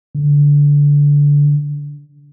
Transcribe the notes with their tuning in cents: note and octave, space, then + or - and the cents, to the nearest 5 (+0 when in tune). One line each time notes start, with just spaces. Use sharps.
D3 -20